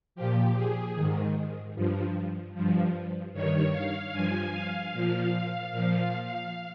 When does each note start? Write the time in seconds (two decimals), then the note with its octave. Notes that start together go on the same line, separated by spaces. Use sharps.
0.15 A#2 F3 G4
0.56 G#4
0.95 G#2 D#3
1.75 G2 F3
2.55 G2 F3
3.33 G2 D#3 C#5
3.73 F5
4.12 G2 F3 G#5
4.52 F5
4.93 A#2 F3 F5
5.72 A#2 F3